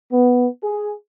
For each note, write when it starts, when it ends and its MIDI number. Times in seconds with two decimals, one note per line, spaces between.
0.12 0.47 59
0.64 0.93 68